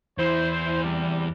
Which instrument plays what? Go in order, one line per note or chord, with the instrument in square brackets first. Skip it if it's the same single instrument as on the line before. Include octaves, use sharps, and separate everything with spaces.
[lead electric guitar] E2 E3 [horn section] E4 C5
[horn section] C3 G3